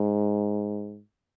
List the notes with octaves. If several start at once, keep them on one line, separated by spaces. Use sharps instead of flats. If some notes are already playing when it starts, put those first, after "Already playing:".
Already playing: G#2